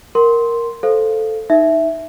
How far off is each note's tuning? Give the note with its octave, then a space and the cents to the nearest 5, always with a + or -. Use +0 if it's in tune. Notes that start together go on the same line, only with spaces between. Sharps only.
A#4 +0 F#5 +15 C6 +0
A4 +0 C5 +0 F5 +0
D#4 +0 E5 +0